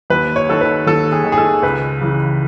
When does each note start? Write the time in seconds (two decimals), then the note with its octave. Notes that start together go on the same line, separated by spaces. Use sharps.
0.10 D#2 B4
0.36 C#5
0.49 D#3 A4
0.61 B4
0.86 D#2 A4
1.12 G#4
1.24 D#3
1.32 G#4
1.38 A4
1.63 C#2 B4
2.01 C#3 E3